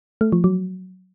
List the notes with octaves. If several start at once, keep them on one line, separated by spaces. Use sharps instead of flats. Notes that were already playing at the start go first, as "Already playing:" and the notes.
A3
F3
F#3